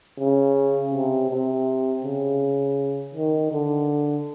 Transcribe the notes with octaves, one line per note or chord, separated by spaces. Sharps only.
C#3
C3
C3
C#3
D#3
D3